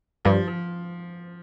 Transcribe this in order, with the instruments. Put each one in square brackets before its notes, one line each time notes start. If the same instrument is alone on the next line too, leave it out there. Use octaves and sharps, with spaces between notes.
[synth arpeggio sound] G2 [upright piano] F3
[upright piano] F3